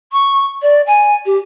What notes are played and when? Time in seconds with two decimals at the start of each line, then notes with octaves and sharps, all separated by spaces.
0.12 C#6
0.62 D5
0.86 G#5
1.25 G4